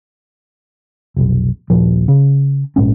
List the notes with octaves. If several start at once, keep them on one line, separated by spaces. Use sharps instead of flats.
F1 B1
D#1 A#1 F3
C#3
A#1 G#2 C#4